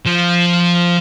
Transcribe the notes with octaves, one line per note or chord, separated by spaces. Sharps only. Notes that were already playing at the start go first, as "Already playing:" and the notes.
F3